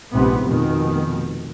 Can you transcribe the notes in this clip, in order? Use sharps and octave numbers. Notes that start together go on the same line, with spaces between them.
A#1 G#2 C3 B3
F1 B2 D#3